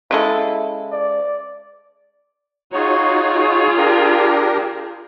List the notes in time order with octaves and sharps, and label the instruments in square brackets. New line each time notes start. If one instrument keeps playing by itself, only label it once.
[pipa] C#3 G#3 A4 [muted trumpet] E4
[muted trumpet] D5
[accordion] D#4 F#4 C#5 [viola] F4 G#4
[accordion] D4 G4 A#4